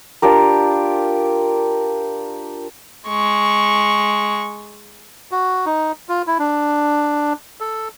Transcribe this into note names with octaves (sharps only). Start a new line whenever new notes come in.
D4 F4 G4 A#4
G#3 C#6
F#4
D#4
F4
E4
D4
A4